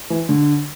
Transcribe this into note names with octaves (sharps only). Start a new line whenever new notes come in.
E3
D3